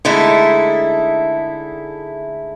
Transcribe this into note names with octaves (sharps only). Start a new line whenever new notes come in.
D3 G#3 A3 D#4 E4 A4